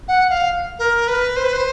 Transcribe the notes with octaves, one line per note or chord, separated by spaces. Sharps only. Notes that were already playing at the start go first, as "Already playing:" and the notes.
F#5
F5
A#4
B4
C5
B4
C5